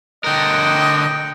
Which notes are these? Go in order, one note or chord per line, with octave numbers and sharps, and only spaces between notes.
D3 A#4 D#5 F#5 G5